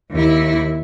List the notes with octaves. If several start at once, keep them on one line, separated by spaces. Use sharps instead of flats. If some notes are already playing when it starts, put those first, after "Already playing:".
D#2 E4